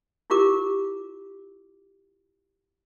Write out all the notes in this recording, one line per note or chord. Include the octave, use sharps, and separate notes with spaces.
E4 F4 G4 A#4 D6